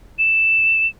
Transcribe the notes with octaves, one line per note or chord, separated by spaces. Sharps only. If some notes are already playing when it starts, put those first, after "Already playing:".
E7